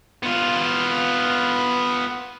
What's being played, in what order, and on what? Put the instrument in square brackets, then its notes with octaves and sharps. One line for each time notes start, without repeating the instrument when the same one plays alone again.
[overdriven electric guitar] B3 F4